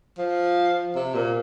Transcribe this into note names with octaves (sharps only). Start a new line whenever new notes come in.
F3
C3
A#2